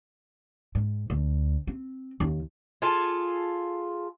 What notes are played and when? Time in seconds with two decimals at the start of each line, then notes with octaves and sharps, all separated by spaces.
0.75 G#2
1.10 D2
1.67 C4
2.20 D#2
2.82 F4 G#4 A4